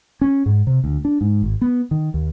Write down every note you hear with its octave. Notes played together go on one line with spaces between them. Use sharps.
C#4
G#2
C3
D2
D4
G#2
G#1
B3
D#3
D#2